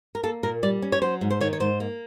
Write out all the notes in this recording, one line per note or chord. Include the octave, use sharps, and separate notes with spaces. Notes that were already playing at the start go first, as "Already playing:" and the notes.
A#4
A#3 A4
A#2 A#4
G3 D5
C#4
C#5
F#3 C5
G#2
C5
D#3 C#5
C#5
G#2 C5
A#3